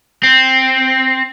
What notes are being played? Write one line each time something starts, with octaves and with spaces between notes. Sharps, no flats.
C4